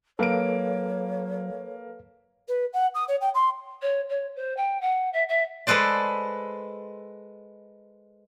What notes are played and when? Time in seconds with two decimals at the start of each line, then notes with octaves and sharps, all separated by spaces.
0.19 F#3 A#3 A4 B4 C#5 F5 D7
2.48 B4
2.73 F#5
2.94 D#6
3.08 C#5
3.21 G5
3.34 C6
3.82 C#5
4.09 C#5
4.35 C5
4.56 G5
4.81 F#5
5.13 E5
5.28 E5
5.67 G#3 A4 B4 C5 D5